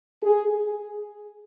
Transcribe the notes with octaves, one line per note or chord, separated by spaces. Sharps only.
G#4